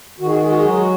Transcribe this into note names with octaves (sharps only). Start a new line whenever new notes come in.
D#3 F#4
G#4
F#4
G#3 G#4
F#4
G#4
F#3 F#4
G#4
F#4